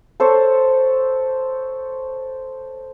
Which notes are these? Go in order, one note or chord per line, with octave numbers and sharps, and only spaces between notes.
A4 C5 C#5